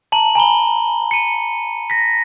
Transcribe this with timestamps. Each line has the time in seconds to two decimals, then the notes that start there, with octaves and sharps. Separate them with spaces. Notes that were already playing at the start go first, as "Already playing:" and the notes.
0.12 A5 A#5 F#7
0.35 G#5 A#5 B5 G7
1.11 C#7 D#7
1.90 A#6 B6